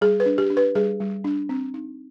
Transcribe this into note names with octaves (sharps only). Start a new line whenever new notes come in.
G3 G#4
B4
D4
G4
D4
B4
G3 G#4
G3
D4
C4
D#4